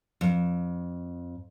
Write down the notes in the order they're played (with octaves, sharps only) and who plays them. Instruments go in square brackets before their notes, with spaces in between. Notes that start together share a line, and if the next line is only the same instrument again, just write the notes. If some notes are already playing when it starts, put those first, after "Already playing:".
[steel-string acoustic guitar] F2